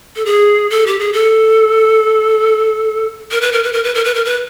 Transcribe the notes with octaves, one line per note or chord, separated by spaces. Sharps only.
A4
G#4
A4
G4
G#4
A4
A#4
B4
A#4
B4
A#4
B4
A#4
B4
A#4
B4